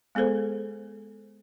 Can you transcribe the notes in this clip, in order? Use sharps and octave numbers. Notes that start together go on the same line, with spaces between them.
G#3 B3 G#4 A4 C5